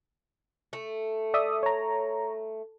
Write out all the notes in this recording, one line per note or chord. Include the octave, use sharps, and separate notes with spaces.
A3
D5 E5 D#6
C#5 A#5